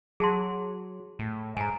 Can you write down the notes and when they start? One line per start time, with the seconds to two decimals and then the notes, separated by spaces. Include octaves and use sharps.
0.20 F#3 G#4 A5 C6
1.19 A2
1.57 G#2 G#5 A#5